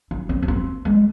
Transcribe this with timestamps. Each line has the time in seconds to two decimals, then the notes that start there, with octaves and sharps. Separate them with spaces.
0.11 E4
0.29 C4
0.42 C#4
0.48 C4
0.85 G#3